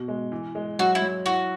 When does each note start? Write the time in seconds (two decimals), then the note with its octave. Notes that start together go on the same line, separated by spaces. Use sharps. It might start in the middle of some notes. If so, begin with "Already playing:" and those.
Already playing: B2
0.08 G#3
0.32 E3
0.55 G#3
0.79 F#3 F#4
0.95 E4
1.02 F#3
1.26 E4 F#4